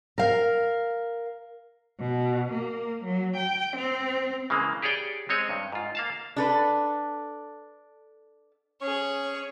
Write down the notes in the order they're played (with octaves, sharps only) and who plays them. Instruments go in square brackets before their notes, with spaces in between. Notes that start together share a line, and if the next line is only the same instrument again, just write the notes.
[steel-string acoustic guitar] A#4 F5
[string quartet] B2
A#3
F#3
G5
C4
[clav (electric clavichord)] C#3 E3 G#3 A#3
G4 G#4 C#5 D5 G5
G#3 C4 C#5 D#5
G2
G#2 F4
A#3 F5 A5
[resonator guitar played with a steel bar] D4 A4 B4
[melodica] C#4 C#6 [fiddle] G#4 C#5